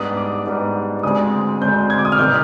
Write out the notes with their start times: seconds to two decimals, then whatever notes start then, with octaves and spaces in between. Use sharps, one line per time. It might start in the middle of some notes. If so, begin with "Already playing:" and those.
Already playing: G#2 G3 B3 D4 D#6
0.17 D6
0.45 G#2 G3 B3 D4
1.03 D2 D3 G#3 C4 D#6
1.61 D2 D3 G#3 C4 G6
1.90 G#6
1.98 D6
2.05 D#6
2.12 F6
2.19 F1 D#3 G3 G6